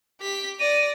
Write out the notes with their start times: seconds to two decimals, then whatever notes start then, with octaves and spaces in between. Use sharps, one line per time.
0.21 G4 B6
0.60 D5 A#6 D#7